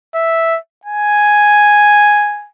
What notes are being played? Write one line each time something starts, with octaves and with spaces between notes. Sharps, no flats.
E5
G#5